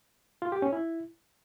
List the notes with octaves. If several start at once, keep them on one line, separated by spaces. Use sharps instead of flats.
F4
G4
C#4
E4